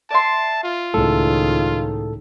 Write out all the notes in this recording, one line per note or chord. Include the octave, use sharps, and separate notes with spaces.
D5 E5 A5 C6
F4
C#2 A2 D#3 A4